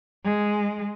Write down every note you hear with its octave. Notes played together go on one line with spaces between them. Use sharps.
G#3